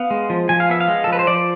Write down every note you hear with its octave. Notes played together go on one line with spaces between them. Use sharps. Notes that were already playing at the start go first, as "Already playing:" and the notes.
Already playing: B3 F5
G#3
F3
F3 G#5
F5
B3 E5
F5
G#3
A4
F3 B4
C5
F3 D5